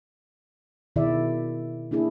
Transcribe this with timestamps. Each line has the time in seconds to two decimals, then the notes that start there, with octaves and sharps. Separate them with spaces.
0.96 B2 D#3 E4 G#4 D5 E5
1.91 A#3 D4 E4 G#4